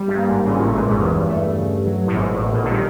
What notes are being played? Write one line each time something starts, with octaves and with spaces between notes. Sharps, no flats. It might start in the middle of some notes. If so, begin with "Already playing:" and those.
Already playing: G3
G2
A#3
G#1 G#2
G#1 G#2 C#3
A#2
A1 A2
A#1 A#2 G#3
G#1 G#2
F#2
E2 G2
A3
C#3
F#3
A2
G#1 G#2 B2
A1 A2
B2
A#1 A#2
D3
D#3 G3